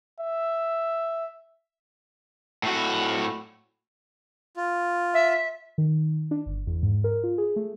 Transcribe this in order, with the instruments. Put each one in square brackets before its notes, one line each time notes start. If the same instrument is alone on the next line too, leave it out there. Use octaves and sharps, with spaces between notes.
[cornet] E5
[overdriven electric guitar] A2 F#4
[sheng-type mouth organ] F4
[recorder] E5
[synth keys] D#3
D4
G1
E2
G#2
A#4
F4
G#4
A3